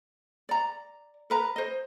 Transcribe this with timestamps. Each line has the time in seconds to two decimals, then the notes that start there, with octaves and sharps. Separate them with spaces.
0.49 D5 A#5
1.30 A#4 B4 A#5
1.56 C5 D#5